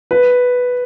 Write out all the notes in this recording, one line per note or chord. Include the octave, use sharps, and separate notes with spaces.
B4